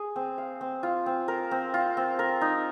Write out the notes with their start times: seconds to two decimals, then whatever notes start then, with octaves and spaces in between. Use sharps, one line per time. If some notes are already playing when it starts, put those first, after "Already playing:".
Already playing: G#4
0.16 C4
0.38 F5
0.61 C4
0.83 F4
1.06 C4
1.28 A#4
1.51 C4
1.74 F4
1.97 C4
2.19 A#4
2.41 D#4